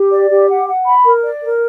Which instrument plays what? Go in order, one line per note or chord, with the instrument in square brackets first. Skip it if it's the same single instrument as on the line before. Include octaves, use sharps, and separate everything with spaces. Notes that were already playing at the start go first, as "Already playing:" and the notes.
Already playing: [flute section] G4
D5
G4
F#5
F#5
B5
A#4
D5
A#4